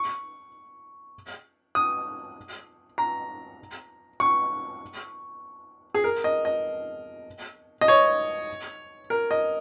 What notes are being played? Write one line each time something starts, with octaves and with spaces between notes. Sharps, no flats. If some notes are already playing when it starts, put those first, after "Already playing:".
Already playing: C#6
D#6
A#5
C#6
G#4
A#4
D#5
D#5
D#5
C#5
A#4
D#5